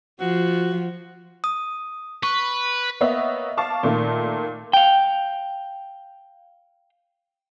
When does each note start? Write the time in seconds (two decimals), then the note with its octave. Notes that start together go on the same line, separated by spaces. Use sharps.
0.20 F3 F#4
1.44 D#6
2.23 B4 C#6
3.01 A#3 B3 C#5 D#5 E5
3.57 F5 A5 C#6 D6
3.83 A#2 D#3 A3 A#3
4.73 F5 G5